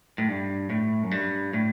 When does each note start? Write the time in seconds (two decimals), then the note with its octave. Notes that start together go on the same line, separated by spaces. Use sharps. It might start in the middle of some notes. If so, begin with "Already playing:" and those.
0.18 A2
0.28 G2
0.70 A2
1.03 F#2
1.11 G2
1.53 A2